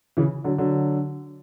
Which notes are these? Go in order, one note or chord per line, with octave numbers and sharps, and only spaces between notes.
C#3 E3
D3 F#3
D3 F#3